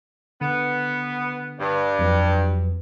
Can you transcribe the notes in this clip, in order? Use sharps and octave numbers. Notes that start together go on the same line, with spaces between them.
D3 B3
G2
F2 F#3 B4